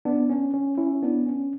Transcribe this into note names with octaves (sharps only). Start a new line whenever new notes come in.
B3 D4
C#4
C#4
C#4 E4
B3 D4
C#4